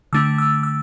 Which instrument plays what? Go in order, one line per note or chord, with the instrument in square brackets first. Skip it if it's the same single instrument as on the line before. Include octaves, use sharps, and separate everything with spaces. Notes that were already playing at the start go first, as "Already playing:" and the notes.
[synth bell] D3 A3 D4 E6
E6
E6